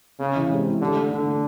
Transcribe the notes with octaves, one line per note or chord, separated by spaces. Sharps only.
C#3 C#4
E3
C3 G#3
E4
D3 G4
A3
D3 D4
A3